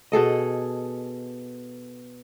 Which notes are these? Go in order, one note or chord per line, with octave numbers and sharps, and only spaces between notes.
B2 G#4 A4 D#5